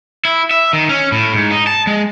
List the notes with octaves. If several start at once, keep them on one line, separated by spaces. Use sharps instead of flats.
E4
E5
D#3
C#4
A2
G#2
D#4
A5
G#3